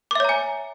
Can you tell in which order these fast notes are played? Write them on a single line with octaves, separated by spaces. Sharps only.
D6 E5 C#5 A#5 G#5